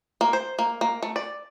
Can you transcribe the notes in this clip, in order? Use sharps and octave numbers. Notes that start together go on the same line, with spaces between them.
A#3
C5
A#3
A#3
A3
D5